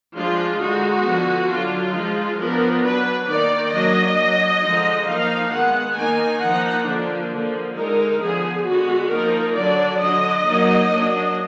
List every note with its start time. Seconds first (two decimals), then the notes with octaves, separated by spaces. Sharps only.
0.15 F3 G#3 D4 F4
0.60 D3 G#3 D#4 F#4
1.04 D3 F3 B3
1.50 D3 F#3 D4 F4
1.94 F3 G#3 D#4
2.39 F3 B3 D4 A#4
2.84 F#3 D4 B4
3.29 D#3 A#3 D#4 D5
3.73 F#3 A#3 D4 D#5
4.18 F#3 D4
4.63 D3 F3 G#3 D#4
5.07 F3 A#3 D#4 F5
5.53 D#3 G#3 B3 F#5
5.97 D#3 A#3 D#4 G#5
6.42 F3 A#3 D#4 F#5
6.87 D3 F3 A#3 D4
7.32 D3 F3 A#3
7.76 D3 G#3 D#4 A#4
8.21 D3 F3 B3 G#4
8.66 D3 G#3 B3 F#4
9.11 F3 A#3 D#4 A#4
9.55 D3 F#3 D4 D5
10.00 D3 F#3 D4 D#5
10.45 F#3 A#3 D#4
10.90 F#3 A#3 D4